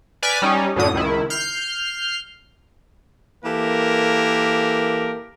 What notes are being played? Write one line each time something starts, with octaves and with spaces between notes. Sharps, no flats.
B4 D5 G#5 D6 F6 B6
G3 C#4 D#4
F#2 A2 D3 D#6
C#2 D#3 E4
F6 G6 C7
E3 A#3 G4 A4 A#4